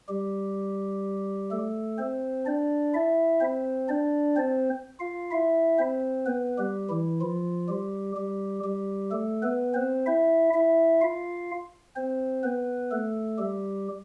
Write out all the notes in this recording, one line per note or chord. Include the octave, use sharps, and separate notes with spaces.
G3 G4
A3 A4
C4 C5
D4 D5
E4 E5
C4 C5
D4 D5
C4 C5
F4 F5
E4 E5
C4 C5
B3 B4
G3 G4
E3 E4
F3 F4
G3 G4
G3 G4
G3 G4
A3 A4
B3 B4
C4 C5
E4 E5
E4 E5
F4 F5
C4 C5
B3 B4
A3 A4
G3 G4